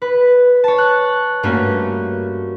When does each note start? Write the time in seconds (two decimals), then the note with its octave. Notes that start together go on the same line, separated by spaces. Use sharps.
0.02 B4
0.64 C#5 A5
0.78 F#6
1.43 G2 A3 A#3 C#4 F#4